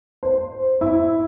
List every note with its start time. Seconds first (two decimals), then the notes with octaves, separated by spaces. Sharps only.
0.23 C5
0.81 E4